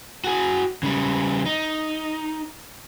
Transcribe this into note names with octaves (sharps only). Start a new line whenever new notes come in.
F#4 G#4
C#3 G3
D#4